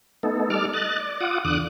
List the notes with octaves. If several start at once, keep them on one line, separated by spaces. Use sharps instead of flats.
A3 B3 D#4 A4
G3 D#4 A4 D6 F6
D#5 F#6 A6
D5
F4 F#5 D6 D#6
E2 D3 D6 D#6 F#6